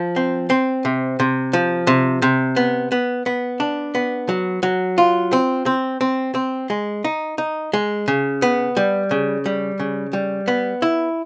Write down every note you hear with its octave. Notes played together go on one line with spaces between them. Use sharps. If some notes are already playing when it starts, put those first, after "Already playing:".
Already playing: F3
C4
C4
C3
C3
F3
C3
C3
B3
B3
B3
D4
B3
F#3
F#3
F4
C4
C4
C4
C4
G#3
D#4
D#4
G#3
C#3
B3
G3
C#3
G3
C#3
G3
B3
E4